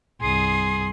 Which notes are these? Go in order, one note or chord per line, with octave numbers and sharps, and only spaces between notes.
C2 G2 G#4 C6 D#6